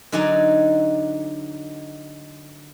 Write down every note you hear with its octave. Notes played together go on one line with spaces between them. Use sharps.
D3 F#3 D#4 D5 G#5 A#5